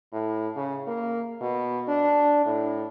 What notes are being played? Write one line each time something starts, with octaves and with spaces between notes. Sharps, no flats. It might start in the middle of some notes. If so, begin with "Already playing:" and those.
A2
C#3
A#3
B2
D4
A2